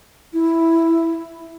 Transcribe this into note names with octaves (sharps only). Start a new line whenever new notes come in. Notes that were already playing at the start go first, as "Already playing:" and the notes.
E4